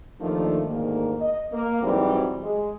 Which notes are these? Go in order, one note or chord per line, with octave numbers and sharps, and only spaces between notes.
D#2 D#3 F3 A3 D4
D2 G#2 D#3 A#3
D#5
A#3
G#2 E3 F#3 G3 C4 F#4
G#3